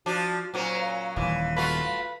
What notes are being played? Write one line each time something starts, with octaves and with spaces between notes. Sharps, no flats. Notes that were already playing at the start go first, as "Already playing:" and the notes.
F3 D4 F#4
A#2 F#3 C#4 C5
F5
D#1 E3 F5
A3 F4 F#4 B4